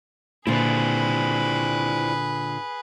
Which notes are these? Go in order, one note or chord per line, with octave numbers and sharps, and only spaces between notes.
A#2 D3 E4 G#4 B4 C5 D5